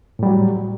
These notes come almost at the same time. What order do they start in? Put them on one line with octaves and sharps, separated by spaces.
A2 G3 F#3